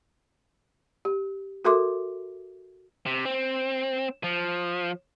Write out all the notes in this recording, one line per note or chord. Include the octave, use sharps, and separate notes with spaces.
G4
F#4 A4 A#4 E5 C6 D6
C3
C4
F3